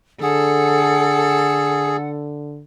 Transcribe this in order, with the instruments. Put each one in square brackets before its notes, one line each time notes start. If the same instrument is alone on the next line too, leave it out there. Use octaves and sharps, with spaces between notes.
[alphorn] D3 [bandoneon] G#4 [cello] A4 [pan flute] F#5